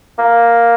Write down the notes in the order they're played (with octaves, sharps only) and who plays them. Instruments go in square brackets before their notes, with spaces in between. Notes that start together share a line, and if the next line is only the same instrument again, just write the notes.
[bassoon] A#3